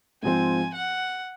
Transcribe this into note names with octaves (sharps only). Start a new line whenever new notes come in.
G#2 F3 C4 G#5
F#5